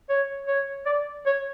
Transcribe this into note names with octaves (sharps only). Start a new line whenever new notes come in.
C#5
C#5
D5
C#5